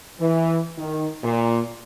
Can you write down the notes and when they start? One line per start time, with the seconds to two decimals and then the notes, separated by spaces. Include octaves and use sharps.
0.20 E3
0.78 D#3
1.23 A#2